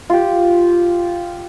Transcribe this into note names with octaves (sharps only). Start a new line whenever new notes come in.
F4 G4